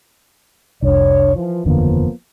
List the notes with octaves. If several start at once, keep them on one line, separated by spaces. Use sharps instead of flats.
F1 C2 D4 C#5
E3 F3
F#1 E2 D3 F3 A#3 B3